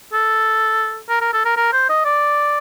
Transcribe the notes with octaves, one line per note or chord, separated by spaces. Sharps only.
A4
A#4
A#4
A4
A#4
A#4
C5
D#5
D5